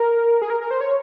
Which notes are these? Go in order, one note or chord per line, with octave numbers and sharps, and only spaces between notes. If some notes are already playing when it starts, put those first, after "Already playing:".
Already playing: A#4
G#4
A#4
A#4
C5
C#5